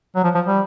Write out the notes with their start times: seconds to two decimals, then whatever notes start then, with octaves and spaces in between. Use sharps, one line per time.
0.15 F#3
0.24 F3
0.35 F3
0.46 G3